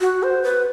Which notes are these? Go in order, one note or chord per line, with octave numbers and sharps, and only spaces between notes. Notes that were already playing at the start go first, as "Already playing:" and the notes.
F#4
C5
B4